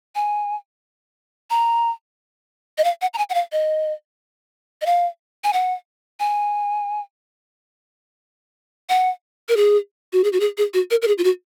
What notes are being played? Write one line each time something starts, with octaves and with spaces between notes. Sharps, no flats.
G#5
A#5
D#5
F5
F#5
A#5
G#5
F#5
F5
D#5
D#5
F5
G#5
F#5
G#5
F#5
A#4
G#4
F#4
G#4
F#4
G#4
G#4
F#4
A#4
A#4
G#4
F4
F#4